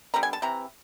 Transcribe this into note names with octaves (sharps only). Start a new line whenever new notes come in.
D3 G3 B3 A#5
G#5
A5
C3 E3 A#5